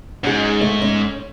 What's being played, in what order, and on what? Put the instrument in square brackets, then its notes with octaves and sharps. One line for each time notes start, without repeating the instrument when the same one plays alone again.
[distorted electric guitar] G#2 [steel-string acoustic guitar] C#4 D#4 G#4
[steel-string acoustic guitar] A3
C#4